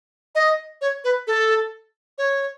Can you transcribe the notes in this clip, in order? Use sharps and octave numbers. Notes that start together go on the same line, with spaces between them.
D#5
C#5
B4
A4
C#5